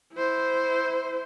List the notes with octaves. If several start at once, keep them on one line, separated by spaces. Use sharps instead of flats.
E4 C5